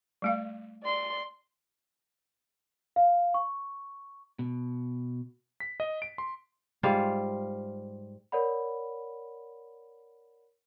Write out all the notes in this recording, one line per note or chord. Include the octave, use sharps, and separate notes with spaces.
G3 A3 F5
D5 C6
F5
C#6
B2
B6
D#5
D7
C6
G#2 G3 F4 F5
A#4 C#5 D5 F#5 B5